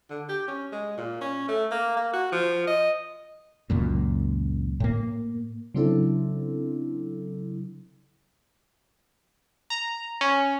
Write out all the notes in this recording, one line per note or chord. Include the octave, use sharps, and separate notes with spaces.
D3
G4
C#4
G#3
A#2
C#4
A3
A#3
A#3
F#4
F3
D#5
C#2 F#2 A#2
A2 A#3
C#3 F#3 C4 D4 E4 A4
A#5
C#4